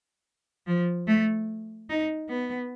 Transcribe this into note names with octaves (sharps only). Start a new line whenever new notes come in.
F3
A3
D#4
B3